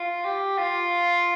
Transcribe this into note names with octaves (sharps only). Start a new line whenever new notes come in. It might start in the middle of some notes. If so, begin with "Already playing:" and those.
Already playing: F4
G4
F4